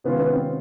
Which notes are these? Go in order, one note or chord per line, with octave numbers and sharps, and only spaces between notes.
C3 D#3 G#3 B3 C#4 F4
B3
C4